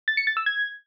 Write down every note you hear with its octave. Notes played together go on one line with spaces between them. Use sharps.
A6
C#7
A6
E6
G#6